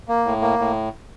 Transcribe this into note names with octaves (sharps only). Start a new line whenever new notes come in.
A#3
A2
A#3
A2